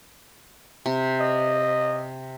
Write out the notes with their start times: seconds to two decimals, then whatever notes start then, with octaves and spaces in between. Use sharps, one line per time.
0.86 C3
1.20 D#5